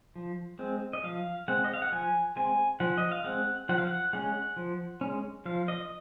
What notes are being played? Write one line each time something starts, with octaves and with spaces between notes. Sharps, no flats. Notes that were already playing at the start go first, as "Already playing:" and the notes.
F3
G#3 C4
D#5
F3 F5
G#3 C4 F#5
D#5
F5
F#5
F3 G#5
G#3 C4 G#5
F3 F#5
D#5
F5
G#3 C4 F#5
F3 F#5
F5
F#5
G#3 C#4 F#5
F3
G#3 C#4
F3 F5
D#5